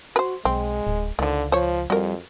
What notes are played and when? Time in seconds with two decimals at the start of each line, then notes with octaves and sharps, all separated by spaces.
0.16 F#4 B4 C5
0.45 B1 G#3 C4
0.87 D1
1.19 C#2 D3 D#3 F3
1.52 F3 C5 C#5
1.90 F2 G3 F#4 A#4